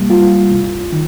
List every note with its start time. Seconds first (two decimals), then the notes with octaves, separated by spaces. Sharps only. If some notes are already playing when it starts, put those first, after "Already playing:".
Already playing: C3 G3 A#3
0.10 F4
0.51 C2
0.92 D#3